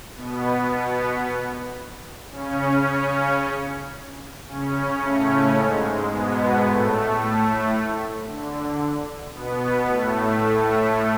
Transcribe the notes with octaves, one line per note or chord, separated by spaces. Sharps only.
B2 B3
C#3 C#4
C#3 C#4
A2 A3
G#2 G#3
B2 B3
A2 A3
D3
B2 B3
A2 A3